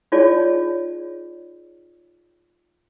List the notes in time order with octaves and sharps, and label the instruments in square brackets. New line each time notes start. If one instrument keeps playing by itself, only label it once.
[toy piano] D#4 F4 G#4 C#5 D5 A5